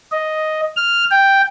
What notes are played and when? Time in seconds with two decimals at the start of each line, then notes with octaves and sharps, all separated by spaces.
0.12 D#5
0.77 F6
1.11 G5